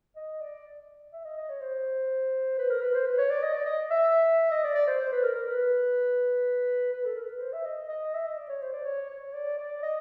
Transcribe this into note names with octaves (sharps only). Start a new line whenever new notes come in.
D#5
D5
E5
D#5
D#5
C#5
C5
B4
A#4
B4
C5
B4
C#5
D5
D#5
D5
D#5
E5
D#5
D5
D5
C5
C5
B4
A#4
A#4
B4
B4
A4
A#4
B4
C5
E5
D#5
D#5
D#5
E5
D#5
D5
C#5
C5
D5
C#5
C#5
D5
D5
D#5